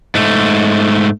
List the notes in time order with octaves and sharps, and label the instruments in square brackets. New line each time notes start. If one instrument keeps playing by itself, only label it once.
[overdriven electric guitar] G#2 A3